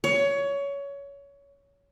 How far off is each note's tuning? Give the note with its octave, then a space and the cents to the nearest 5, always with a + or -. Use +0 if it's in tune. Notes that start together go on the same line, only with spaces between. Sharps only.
C#5 +20